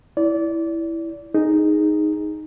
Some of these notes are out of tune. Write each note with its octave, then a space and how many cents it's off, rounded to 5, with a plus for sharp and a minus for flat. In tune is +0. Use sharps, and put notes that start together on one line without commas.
E4 +0 D5 -25
D#4 +0 G#4 -5